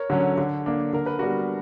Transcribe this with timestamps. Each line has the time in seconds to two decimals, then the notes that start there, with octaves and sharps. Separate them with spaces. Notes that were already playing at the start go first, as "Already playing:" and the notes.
Already playing: A#4 C#5
0.10 D3 F#3 C#4
0.38 D3
0.66 A#3 D4
0.93 D3 A#4
1.06 B4
1.19 G3 B3 D4 F#4 A#4